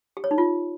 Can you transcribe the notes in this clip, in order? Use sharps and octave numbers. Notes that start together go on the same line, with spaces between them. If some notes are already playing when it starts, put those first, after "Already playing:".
G4
C#5
D#4
F4